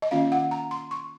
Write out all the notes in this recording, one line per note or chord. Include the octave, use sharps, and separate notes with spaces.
D#5
D#3 A#3 C#4 F4 F5
F#5
A#5
C6
C#6